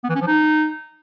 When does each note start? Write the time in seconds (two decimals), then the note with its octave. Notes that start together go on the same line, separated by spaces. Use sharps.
0.04 B3
0.10 E3
0.15 C#4
0.21 F3
0.27 D#4